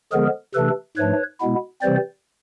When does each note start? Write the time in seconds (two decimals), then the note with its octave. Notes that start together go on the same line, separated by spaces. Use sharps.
0.12 D3 F3 G#3 B3 G#4 A#4
0.54 C3 E3 A3 D4 A4 B4
0.97 G#2 F3 A3 D4 B4 C#5
1.40 B2 G#3 B3 E4
1.82 C3 E3 G3 C4 C5 D5